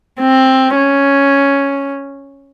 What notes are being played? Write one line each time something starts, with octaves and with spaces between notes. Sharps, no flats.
C4
C#4